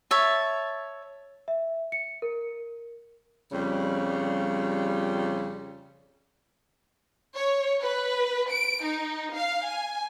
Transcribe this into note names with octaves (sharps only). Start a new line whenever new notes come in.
C#5 E5 A5
E5
C#7
A#4
F2 C#3 G3
C#5
B4
D7
D#4
F5
G#5